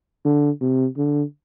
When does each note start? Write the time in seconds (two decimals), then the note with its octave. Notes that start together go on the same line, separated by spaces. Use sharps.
0.25 D3
0.61 C3
0.97 D3